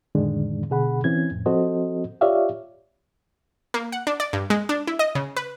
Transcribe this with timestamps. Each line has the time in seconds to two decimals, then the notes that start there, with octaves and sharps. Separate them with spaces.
0.15 F2 A2 D3 D#3 G#3 D4
0.70 B2 D3 G#4 F#5 B5
1.04 E3 C4 C#4 G#6
1.30 F2 A2
1.46 F3 C4 F#4 A4 C5 D#5
2.21 F4 G4 C#5 D5 E5 F5
3.74 A#3
3.92 F#5
4.07 D4
4.20 D5
4.33 G2
4.50 G#3
4.69 D4
4.87 E4
4.99 D#5
5.15 C#3
5.36 B4